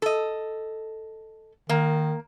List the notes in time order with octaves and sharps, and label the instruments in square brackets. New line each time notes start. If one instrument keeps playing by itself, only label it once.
[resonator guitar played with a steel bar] A4 D#5
[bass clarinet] D#3 [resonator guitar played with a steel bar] A#3